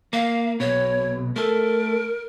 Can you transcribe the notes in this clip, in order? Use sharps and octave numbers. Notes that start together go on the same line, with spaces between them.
A#3 F5
B1 B2 C#5
A3 A4 A#4